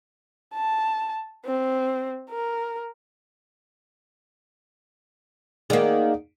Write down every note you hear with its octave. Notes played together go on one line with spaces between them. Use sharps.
A5
C4
A#4
D#3 A#3 G#4 D5 F#5